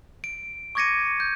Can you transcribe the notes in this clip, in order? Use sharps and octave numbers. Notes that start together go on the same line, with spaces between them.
D7
C#6 D6 G#6 A#6 C#7 D#7
G6